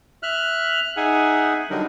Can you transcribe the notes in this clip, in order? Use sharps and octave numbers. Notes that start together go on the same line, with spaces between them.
E5 F6 F#6
D#4 G#4 E5 F#5 G#5
D3 F#3 G3 D4 D#4 A#4